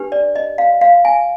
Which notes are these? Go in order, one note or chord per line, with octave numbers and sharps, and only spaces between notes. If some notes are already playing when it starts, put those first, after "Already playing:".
Already playing: D4 G4 B4
D5
D#5
F5
F5
G#5